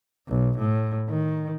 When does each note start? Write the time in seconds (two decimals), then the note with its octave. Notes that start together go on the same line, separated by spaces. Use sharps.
0.28 B1
0.58 A2
1.09 D#3